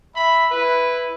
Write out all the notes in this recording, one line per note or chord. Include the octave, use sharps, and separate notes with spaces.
E5 B5
E4 B4